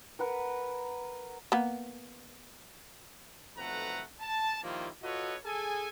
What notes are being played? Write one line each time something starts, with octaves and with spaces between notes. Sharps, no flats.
A#4 B4 F#5
A#3 B3
B1 F2 A3 B4 F#5 A#5
A5
D#3 F3 G3 A#3 E4 F4
F4 F#4 A4 B4 C#5 D#5
G#4 A4 G#5